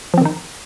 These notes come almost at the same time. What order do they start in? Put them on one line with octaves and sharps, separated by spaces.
F3 C4 D#3 D#4